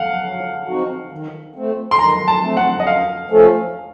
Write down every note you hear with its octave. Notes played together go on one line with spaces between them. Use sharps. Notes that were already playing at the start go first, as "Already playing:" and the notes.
Already playing: F5 F#5
F#3
C4 D#4 F#4
D#3
A3 C4
C6
D#3 A#5
A5
A3 C4
F#5
D#5
F#2 F5
F3 A3 C#4 A4